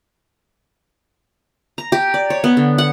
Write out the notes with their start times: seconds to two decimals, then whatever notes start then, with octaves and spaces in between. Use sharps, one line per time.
1.78 A#5
1.92 G4
2.14 D5
2.30 C#5
2.44 B3
2.57 D3
2.78 F#5